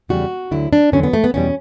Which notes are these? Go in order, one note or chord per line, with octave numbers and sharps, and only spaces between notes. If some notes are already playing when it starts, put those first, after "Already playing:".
E2 C#3 G3 F#4
D2 D3 F#3 E4
D4
E2 D3 F#3 C#4
B3
A3
B3
E2 B2 G3 C#4